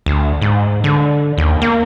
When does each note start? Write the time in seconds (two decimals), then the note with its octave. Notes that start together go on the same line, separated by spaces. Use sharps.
0.06 D2
0.42 G#2
0.84 D3
1.38 D#2
1.62 A#3